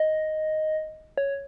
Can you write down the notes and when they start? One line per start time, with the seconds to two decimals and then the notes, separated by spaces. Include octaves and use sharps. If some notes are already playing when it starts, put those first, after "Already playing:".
Already playing: D#5
1.18 C#5